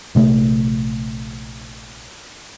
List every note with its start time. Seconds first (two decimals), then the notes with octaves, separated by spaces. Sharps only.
0.15 A#1 C3 A3